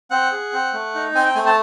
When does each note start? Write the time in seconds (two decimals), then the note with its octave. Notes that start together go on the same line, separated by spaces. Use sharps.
0.11 C4 F#5
0.32 G#4
0.53 C4
0.73 A3
0.95 D#4
1.15 C4 G#5
1.25 G5
1.35 A3 G#5
1.46 A5